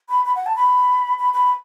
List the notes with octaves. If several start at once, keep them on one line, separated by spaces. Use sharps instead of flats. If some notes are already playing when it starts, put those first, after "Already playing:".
B5
B5
F#5
A5
B5
B5
B5